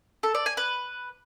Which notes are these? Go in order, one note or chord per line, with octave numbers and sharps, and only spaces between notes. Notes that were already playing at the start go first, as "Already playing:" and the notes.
A4
D5
G#5
B4